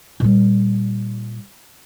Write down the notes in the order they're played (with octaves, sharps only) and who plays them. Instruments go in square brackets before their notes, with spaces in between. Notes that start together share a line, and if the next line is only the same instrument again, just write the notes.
[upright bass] A#2 G3